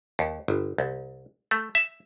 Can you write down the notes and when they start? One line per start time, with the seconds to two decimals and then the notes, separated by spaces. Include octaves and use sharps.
0.19 D#2
0.48 G1
0.78 C2
1.51 A3
1.75 E5